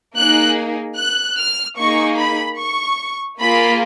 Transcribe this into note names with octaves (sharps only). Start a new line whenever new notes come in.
A#3 D#4 G#4 F#6
F#6
F6
A#3 D#4 G#4 C#6
B5
C#6
A#3 F4 G#4 B5